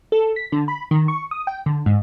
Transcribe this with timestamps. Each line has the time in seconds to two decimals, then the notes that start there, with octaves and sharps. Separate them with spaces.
0.12 A4
0.36 B6
0.52 D3
0.68 B5
0.91 D#3
1.08 C#6
1.31 D#6
1.47 G5
1.66 D3
1.86 G#2